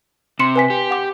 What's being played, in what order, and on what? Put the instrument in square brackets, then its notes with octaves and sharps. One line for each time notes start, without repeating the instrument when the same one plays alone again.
[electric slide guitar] C3 [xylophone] C6 C#7 E7
[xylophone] B4 G#5 B6
[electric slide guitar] G4
[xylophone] F#5 D6